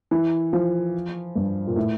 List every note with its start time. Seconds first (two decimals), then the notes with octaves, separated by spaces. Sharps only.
0.11 E3
0.53 F3
1.36 G2
1.67 A#2
1.76 A2